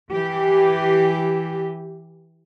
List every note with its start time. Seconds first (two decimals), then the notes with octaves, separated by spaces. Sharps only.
0.12 E3 G4